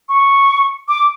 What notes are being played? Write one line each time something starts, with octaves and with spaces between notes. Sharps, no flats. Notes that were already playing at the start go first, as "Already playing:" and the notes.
C#6
D6